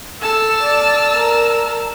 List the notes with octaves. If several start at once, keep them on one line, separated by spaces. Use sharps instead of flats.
A4 A5 E6 F6
D5
A#4